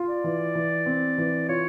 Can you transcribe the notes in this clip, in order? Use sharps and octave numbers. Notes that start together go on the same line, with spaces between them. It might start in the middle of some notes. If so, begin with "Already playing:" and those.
Already playing: F4
D5
E3
E3
C4
E3
F4 C#5